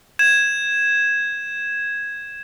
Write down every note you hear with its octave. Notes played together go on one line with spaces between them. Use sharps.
G#6 E7